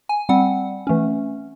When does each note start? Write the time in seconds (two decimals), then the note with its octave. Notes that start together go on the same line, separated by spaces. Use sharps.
0.09 G#5
0.29 G3 C4 F#5
0.87 E3 A3 C#4